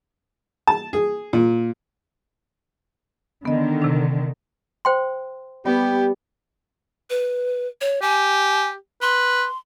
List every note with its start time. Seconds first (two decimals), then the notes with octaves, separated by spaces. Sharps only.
0.67 A5
0.93 G#4
1.33 A#2
3.45 D3 D#3 B3 D#5
3.82 C3 D4
4.85 C5 G5 C6
5.66 G3 B3 G4
7.10 B4
7.81 C#5
8.02 G4 G#5
9.02 B4 C6